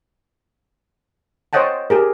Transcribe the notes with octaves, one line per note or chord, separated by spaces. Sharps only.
C5 C#5 D#5 F#5 G5 A5
G4 G#4 A#4